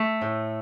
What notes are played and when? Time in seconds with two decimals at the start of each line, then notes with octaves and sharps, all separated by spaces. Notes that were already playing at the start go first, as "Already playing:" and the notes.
Already playing: A3
0.21 A2